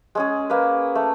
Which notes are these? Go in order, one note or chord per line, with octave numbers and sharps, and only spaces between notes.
G#3 C#4 G#4
A#3 B4
A3